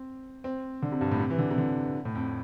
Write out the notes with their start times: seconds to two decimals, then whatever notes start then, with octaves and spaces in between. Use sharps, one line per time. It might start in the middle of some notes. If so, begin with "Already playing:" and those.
Already playing: C4
0.44 C4
0.82 D3
0.92 C3
1.01 G2
1.11 A2
1.20 C3
1.30 E3
1.38 D3
1.51 C3
1.58 D3
2.05 A2
2.15 F2